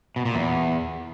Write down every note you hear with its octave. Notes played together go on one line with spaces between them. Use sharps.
B2
A#2
E2